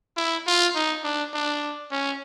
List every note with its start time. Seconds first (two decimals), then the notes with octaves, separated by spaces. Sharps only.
0.17 E4
0.47 F4
0.75 D#4
1.03 D4
1.34 D4
1.91 C#4